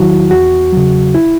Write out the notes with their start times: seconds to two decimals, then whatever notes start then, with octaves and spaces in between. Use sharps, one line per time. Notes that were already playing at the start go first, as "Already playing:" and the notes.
Already playing: E2 D#3 F#3 E4 F#4
0.31 E2 F#4
0.72 C#3 F#3
1.15 E4